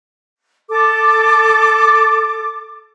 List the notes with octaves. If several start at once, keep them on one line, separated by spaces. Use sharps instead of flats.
A4 D6